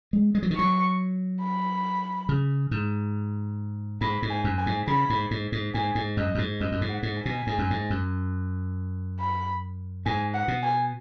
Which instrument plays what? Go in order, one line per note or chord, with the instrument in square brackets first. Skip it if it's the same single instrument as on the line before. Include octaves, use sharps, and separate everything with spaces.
[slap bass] G#3
G#3
F#3
D#3
[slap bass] F#3 [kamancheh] C#6
[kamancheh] B5
[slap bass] C#3
G#2
[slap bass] G#2 [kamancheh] B5
[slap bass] G#2
[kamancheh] G#5
[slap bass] F#2
[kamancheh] G#5
[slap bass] G#2
[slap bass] C#3 [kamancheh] B5
[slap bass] G#2
G#2
G#2
[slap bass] G#2 [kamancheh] G#5
[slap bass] G#2
[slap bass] F#2 [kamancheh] D#5
[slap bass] F#2
G#2
[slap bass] F#2 [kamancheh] D#5
[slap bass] F#2
G#2
[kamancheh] F#5
[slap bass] G#2
[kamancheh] G#5
[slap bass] B2
G#2
F#2
G#2
F#2
[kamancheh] B5
[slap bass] G#2 [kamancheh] G#5
[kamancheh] F#5
[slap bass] B2
[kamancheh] G#5